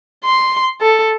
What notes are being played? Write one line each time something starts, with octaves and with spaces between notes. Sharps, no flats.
C6
A4